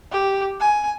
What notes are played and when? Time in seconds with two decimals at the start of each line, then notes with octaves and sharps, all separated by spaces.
0.12 G4
0.61 G#5